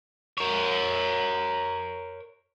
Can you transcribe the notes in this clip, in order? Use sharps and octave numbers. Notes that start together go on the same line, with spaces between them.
A#4 C#5